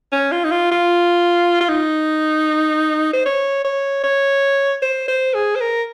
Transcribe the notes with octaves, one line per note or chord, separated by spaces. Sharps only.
C#4
F4
D#4
F4
F4
F4
D#4
C5
C#5
C#5
C#5
C5
C5
G#4
C5
A#4